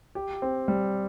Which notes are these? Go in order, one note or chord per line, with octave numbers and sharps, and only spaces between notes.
G4
C4
G3